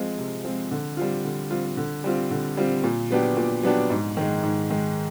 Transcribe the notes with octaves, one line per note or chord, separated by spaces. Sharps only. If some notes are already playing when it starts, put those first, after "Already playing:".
Already playing: F3 G#3 C4 F4
C3
F3 G#3 C4 F4
D3
G3 C4 F4
D3
G3 C4 F4
D3
G3 C4 F4
D3
G3 C4 F4
A#2
F#3 B3 D4 G4
A#2
F#3 B3 D4 G4
G#2
D#3 G#3
G#2
D#3 G#3